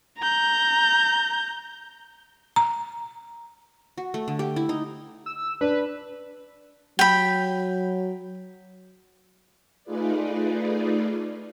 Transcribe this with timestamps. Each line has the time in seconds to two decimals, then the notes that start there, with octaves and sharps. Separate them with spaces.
0.19 A#5 G6
2.56 A#5
3.98 F#4
4.14 A3
4.28 D3
4.39 G4
4.56 E4
4.69 D#4
5.26 E6
5.61 D4 B4
6.99 F#3 G5 B5
9.84 A3 D#4 F4 G#4 B4 D5